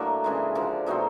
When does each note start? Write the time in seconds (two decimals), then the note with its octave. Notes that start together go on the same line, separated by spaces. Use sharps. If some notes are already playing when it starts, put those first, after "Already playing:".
Already playing: A2 F#3 A#3 D4
0.24 C#3 E3 G#3
0.55 D3 F3 A#3
0.86 B2 F#3 A3 C4 D#4